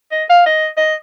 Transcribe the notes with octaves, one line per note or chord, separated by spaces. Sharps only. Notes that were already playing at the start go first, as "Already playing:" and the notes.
D#5
F5
D#5
D#5